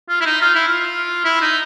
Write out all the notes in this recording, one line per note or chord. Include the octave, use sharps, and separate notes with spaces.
F4
E4
D#4
F4
E4
F4
E4
D#4